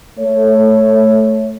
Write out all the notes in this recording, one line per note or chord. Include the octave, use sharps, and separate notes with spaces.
A3 C#5